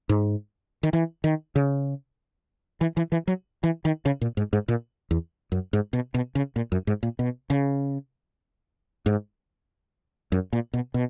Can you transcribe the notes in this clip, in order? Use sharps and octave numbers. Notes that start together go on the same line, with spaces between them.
G#2
D#3
E3
D#3
C#3
E3
E3
E3
F#3
E3
D#3
C#3
A#2
G#2
G#2
A#2
E2
F#2
G#2
B2
B2
C#3
A#2
F#2
G#2
A#2
B2
C#3
G#2
F#2
A#2
B2
B2